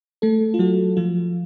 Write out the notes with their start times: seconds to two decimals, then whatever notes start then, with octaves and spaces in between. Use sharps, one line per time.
0.22 A3 A4
0.54 F4
0.59 F#3 F#4
0.97 F3 F4